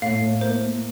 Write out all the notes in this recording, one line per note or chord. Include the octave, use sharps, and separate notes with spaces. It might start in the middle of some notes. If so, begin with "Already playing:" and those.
A2 F5
A2
A#3 C5
A#3